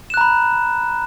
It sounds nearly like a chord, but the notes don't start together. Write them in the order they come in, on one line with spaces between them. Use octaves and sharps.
E7 F#6 A#5 B5